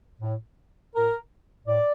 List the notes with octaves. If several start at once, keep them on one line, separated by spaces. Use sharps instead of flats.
A2
A2 A#4
A2 D5